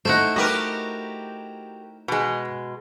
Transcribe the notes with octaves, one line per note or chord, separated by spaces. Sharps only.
A3 D#4 E4 C5 F#5
F#4 G4 A#4 B4 D#5
B2 G#3